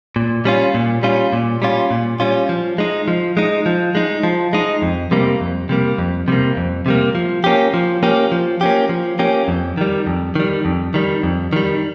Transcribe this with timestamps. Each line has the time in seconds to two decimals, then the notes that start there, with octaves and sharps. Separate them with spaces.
0.16 A#2
0.45 G3 C#4 F4
0.74 A#2
1.03 G3 C#4 F4
1.33 A#2
1.62 G3 C#4 F4
1.91 A#2
2.20 G3 C#4 F4
2.49 F3
2.78 G#3 D#4
3.08 F3
3.37 G#3 D#4
3.66 F3
3.95 G#3 D#4
4.23 F3
4.53 G#3 D#4
4.82 F2
5.11 C3 G3 A#3
5.41 F2
5.69 C3 G3 A#3
5.98 F2
6.28 C3 G3 A#3
6.57 F2
6.86 C3 G3 A#3
7.15 F3
7.44 A#3 C#4 G4
7.74 F3
8.03 A#3 C#4 G4
8.32 F3
8.61 A#3 C#4 G4
8.89 F3
9.19 A#3 C#4 G4
9.48 F2
9.78 D#3 G3
10.06 F2
10.35 D#3 G3
10.65 F2
10.94 D#3 G3
11.23 F2
11.53 D#3 G3